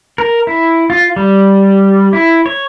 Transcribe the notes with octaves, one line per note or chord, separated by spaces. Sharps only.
A#4
E4
F4
G3
E4
C#5